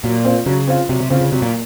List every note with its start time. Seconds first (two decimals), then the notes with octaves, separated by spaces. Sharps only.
0.04 A#2 F#3
0.25 C4 F4
0.46 C#3 F#3
0.68 C4 F4
0.89 C3 F#3
1.00 C3
1.10 C#3 C4 F4
1.21 C#3
1.32 C3 F#3
1.42 A#2